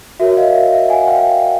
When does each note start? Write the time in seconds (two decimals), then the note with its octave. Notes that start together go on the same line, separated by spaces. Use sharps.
0.19 F#4 A#4 C#5 E5
0.37 D#5 F5
0.54 E5
0.72 E5
0.89 F#5 G#5
1.07 F5 G5